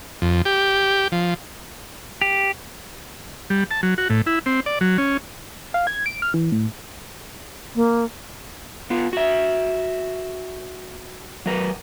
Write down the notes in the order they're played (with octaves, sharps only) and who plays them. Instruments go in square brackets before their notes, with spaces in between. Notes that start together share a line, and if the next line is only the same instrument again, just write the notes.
[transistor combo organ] F2
G4
F3
[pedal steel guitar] G4
[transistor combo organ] G3
A5
F#3
F#4
A2
E4
C4
D5
F#3
C#4
[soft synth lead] F5
G#6
D7
F6
E3
A2
[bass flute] A#3
[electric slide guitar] B3 F4
F#4 E5
F#3 A#4 B4